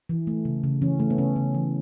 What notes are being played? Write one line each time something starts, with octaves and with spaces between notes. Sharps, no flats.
E3
A3
C#3
C#3
E3 C#4
A3
B3
C#3 C#4
C#3
E3